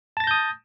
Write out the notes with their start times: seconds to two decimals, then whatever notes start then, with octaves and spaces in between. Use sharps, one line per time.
0.17 A5
0.20 A6
0.24 A#6
0.27 G6
0.31 D#6